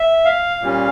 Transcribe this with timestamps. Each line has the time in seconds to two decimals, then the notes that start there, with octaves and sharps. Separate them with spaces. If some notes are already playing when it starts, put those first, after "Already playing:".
Already playing: E5
0.25 F5
0.61 A#2 G3 C#4